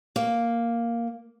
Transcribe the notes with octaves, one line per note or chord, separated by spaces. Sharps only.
A#3